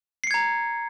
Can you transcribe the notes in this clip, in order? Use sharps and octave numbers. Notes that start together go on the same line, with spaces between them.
A#5 G#6 C7 C#7